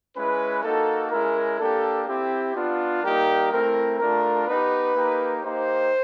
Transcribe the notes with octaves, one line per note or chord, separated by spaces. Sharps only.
G#3 C#4 E4 B4
A#3 D#4 F#4 A4
G#3 C#4 E4 A#4
A#3 D4 G4 A4
C4 E4 G4
B3 D4 F4
G3 A#3 D#4 G4 A#4
A3 C4 E4 A#4
A3 D4 F4 A#4
B3 D#4 G4 B4
A#3 D#4 G4
A#3 D#4 G4 C5